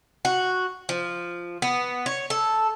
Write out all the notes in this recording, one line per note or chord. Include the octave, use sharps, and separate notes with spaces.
F#4
F3
B3
C#5
A4